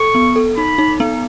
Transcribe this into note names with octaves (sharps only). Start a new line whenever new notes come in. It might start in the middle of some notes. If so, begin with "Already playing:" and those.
Already playing: A4 C#6
B3
A4
D#4 B5
D#4
B3